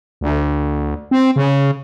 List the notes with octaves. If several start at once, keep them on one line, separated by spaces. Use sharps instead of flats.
D2
C4
C#3